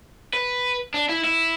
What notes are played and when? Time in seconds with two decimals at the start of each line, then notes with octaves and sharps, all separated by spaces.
0.33 B4
0.94 D4
1.09 E4
1.24 E4